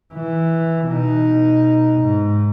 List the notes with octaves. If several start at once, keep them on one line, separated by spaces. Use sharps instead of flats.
E3
B2 D#4
G#2